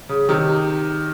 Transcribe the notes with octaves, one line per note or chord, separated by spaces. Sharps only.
C#3
C3 D#3